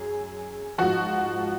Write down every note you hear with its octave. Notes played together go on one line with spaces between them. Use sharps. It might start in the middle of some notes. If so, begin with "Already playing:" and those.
Already playing: F#2 G#4
G#2 F3 F#4